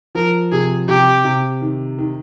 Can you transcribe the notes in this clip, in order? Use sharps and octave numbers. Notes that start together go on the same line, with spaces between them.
F3 A#4
C3 G#4
C3 G4
C3
D#3
D#3